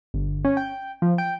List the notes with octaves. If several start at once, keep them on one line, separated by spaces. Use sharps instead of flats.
G1
C#4
G5
F3
G5